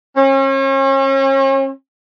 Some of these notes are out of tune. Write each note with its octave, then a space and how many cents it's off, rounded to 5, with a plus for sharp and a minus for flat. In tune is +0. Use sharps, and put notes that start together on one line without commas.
C#4 -40